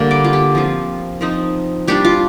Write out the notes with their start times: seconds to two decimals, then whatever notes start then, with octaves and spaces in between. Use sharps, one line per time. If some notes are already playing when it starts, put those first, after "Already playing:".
Already playing: D3 G3 A#3
0.11 D5
0.24 F4
0.33 G4
0.55 F3 C4 F4
1.21 F3 C4 D#4
1.87 G3 D4 F4 G4
2.05 F4